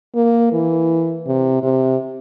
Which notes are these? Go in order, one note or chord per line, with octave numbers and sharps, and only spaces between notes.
A#3
E3
C3
C3